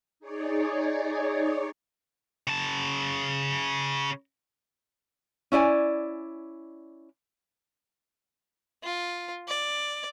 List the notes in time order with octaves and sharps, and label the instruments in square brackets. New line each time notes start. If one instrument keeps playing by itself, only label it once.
[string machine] D#4 G#4 C#5 D5
[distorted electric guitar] C#3 A5
[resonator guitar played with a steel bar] C#4 E4 D5 G#5
[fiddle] F4
D5